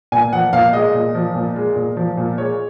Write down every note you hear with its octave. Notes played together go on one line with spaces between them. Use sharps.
A#2 G#5
F3 F#5
A#2 F5
G#3 D#5
A#2
F3
A#2
G#3
A#2
F3
A#2
G#3 C#5